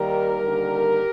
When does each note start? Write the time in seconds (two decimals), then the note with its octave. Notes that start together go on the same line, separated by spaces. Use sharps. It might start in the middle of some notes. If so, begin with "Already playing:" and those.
Already playing: D#2 D#3 G3 G4 A#4
0.41 D#2 D3 G3